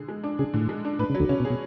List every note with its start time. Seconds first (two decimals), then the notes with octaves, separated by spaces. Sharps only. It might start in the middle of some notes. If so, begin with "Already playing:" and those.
Already playing: D3 G#4
0.08 G#3
0.24 D4
0.39 C#3 G#4
0.54 A2 D3
0.69 G#3
0.85 D4
0.99 A2 B4
1.10 C#3
1.15 F#3
1.20 D2 D3
1.29 C#3 C#4
1.40 B2
1.45 G#4
1.50 B2